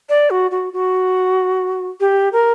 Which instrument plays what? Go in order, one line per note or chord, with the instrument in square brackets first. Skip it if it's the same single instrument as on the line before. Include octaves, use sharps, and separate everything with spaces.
[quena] D5
F#4
F#4
F#4
G4
A#4